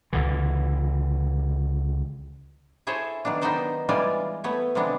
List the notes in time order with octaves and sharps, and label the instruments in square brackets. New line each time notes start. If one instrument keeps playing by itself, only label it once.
[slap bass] C#2 D3 E3
[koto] E4 G#4 A4 C5 C#5
D#3 F#3 B3 D4
D#3 B3 D4 D#4 C5 D5
E3 G3 G#3 F4 D5
A3 B3 B4 C#5
C3 D#3 G#3 B3 D4